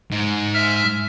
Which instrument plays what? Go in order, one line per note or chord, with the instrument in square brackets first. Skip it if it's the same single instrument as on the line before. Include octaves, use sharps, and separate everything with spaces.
[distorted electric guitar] G#2
[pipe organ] E5 F6